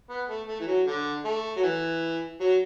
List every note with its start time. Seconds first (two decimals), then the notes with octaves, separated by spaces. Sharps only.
0.09 B3
0.28 A3
0.47 A3
0.60 E3
0.67 F#3
0.86 D3
1.25 A3
1.57 F#3
1.63 E3
2.40 F#3